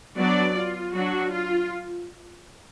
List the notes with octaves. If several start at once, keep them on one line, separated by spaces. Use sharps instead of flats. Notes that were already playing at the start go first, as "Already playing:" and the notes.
F#3 B3 D4 D5
F4
F#3 D4 F#4
F4